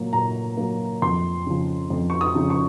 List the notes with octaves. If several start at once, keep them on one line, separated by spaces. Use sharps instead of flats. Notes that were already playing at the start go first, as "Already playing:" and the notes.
Already playing: A#2 F#3 A#3
A#2 A#5
F#3 A#3
F2 C6
C#3 F3
F2
C#6
D#6
C#3 F3
C#6